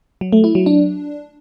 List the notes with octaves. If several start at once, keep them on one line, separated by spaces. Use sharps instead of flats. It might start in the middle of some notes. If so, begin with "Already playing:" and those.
F#3
A3
E4
F#3
D4